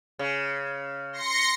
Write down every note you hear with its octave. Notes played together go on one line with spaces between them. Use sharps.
C#3
C6 A#6 C#7